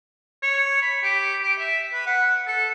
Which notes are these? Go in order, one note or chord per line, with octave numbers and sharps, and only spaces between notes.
C#5
B5
G4
G4
E5
B4
F#5
A4